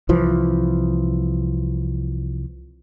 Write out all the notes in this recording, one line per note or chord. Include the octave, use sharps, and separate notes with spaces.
C2 E3 F3